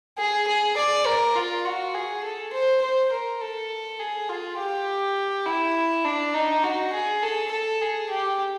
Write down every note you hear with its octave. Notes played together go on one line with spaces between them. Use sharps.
G#4
G#4
D5
A#4
F4
F#4
G#4
A4
C5
C5
A#4
A4
G#4
F4
G4
E4
D4
D#4
F#4
G#4
A4
A4
G#4
G4